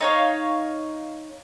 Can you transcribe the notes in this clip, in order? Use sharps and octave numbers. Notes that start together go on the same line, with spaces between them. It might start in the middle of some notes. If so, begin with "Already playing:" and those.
D#4 C#5 F5